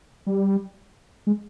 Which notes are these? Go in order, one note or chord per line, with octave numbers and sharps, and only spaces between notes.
G3
G#3